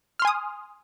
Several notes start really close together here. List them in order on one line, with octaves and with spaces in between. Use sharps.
F6 C6 G#5 D#6